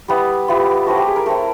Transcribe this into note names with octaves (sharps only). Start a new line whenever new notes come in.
G3 B3 E4
G3 B3 E4 F4
A3 C4 E4 F#4
G4
G#4
A#4
A3 C4 E4 A#4